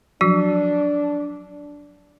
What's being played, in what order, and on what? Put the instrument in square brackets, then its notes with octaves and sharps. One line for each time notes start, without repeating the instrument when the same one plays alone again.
[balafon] F3 F#3 F#4 [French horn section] D4